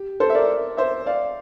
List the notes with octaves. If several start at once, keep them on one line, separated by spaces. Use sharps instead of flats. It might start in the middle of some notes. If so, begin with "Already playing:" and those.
Already playing: G4
A4 C5
E5
A#4 D5
C5 E5
D5 F5